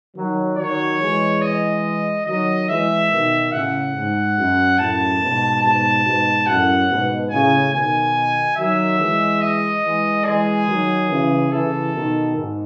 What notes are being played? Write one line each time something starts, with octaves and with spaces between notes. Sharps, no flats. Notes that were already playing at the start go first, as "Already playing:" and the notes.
D#3 F#3
D#3 F#3 C#5
E3 G#3
D#5
D#3 F#3 D#5
E3 G#3 E5
B2 D#3
A2 C#3 F#5
G#2
F#2
F#2 A2 A5
G#2 B2
G#2 B2 A5
G#2 B2
F#2 A2 F#5
G#2 B2
A2 C#3 G#5
B2 D#3 G#5
D#3 F#3 E5
E3 G#3
D#5
E3 G#3
E3 G#3 G#4
D#3 F#3
C#3 E3
C#3 E3 A4
B2 D#3
G#2